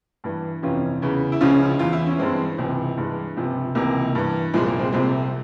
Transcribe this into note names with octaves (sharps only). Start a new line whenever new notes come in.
G2 E3
F2 C3 E3 C#4 F4
E2 C#3 E3
E4
C#2 C#3 F3 C#4 F4
E2 E3 F4
E4
C#4
G2 E3 G#3 C4
C#2 C3 E3
G2 E3 G#3
C#2 C3 F3
C#2 C3 E3 A#3
G2 E3
C2 A#2 F3 G#3
A#3
G#3 C4
C2 C3 F3 G#3 C4